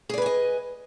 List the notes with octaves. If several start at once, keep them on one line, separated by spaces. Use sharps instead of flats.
G#4 B4 D5 D#5 G#5